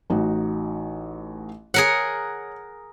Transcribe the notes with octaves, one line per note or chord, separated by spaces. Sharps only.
A1 D#4 F#4
G#4 A#4 C#5 F#5